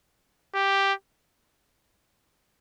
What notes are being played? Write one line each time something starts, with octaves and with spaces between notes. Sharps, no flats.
G4